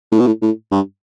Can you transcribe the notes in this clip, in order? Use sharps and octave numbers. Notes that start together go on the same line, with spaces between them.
A2
B2
A2
A2
G2